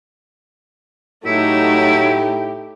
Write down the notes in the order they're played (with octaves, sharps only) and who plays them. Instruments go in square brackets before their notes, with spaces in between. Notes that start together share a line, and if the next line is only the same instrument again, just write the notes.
[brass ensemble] A2 G4 [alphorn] F#3 [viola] A3 D#4 [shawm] E4